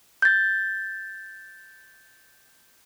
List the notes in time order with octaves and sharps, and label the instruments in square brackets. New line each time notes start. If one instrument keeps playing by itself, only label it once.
[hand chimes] G6 A6